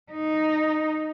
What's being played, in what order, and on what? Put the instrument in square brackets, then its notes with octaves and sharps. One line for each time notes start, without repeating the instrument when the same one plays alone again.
[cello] D#4